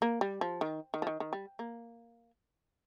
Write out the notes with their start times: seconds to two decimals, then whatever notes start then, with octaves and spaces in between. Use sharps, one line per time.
0.02 A#3
0.21 G3
0.41 F3
0.61 D#3
0.94 D#3
1.02 F3
1.07 D#3
1.20 D#3
1.33 G3
1.59 A#3